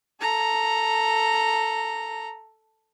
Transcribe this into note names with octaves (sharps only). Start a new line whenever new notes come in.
A4 A#5